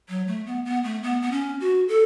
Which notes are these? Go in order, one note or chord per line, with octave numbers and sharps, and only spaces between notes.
F#3
A3
B3
B3
A3
B3
B3
C#4
F#4
A4